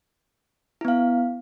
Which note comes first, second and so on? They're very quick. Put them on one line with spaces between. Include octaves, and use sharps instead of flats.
E4 B3 F5